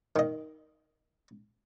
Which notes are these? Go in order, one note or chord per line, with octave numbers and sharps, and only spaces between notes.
D#3 D#5